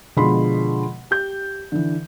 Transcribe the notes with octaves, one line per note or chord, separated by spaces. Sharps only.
B2 D3 F3 G#3 B5 C6
G4 G6
D3 E3